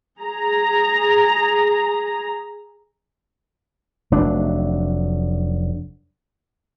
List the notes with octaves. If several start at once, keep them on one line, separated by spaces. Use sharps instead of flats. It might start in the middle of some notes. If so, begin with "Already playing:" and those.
G#4 A#5
F1 F#3 D4